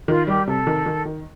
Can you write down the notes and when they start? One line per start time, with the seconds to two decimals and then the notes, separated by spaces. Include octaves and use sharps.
0.08 D#3 F4
0.27 G3 G4
0.47 C3 A4
0.67 D#3
0.86 D#3
1.05 D#3